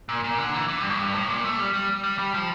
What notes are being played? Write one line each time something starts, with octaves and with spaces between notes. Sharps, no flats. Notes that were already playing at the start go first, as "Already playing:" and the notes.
A#2
A#2
D3
E3
E3
G2
A2
G2
A2
A#2
A3
G3
G3
G3
G3
F3